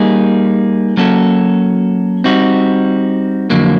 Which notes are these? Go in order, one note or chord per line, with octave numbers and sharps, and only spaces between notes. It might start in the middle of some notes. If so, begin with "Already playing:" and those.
Already playing: G3 A#3 D#4 G#4
F#3 A#3 C#4 F#4 A4
G3 C4 D#4 F#4
F2 D3 F#3 A#3